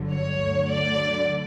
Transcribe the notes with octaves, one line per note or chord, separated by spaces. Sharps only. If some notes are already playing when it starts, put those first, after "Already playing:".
Already playing: G1 G2 D3 F#3
C#5
D2 D3 F#3
D5